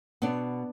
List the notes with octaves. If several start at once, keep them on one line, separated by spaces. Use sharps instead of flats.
B2 B3 D4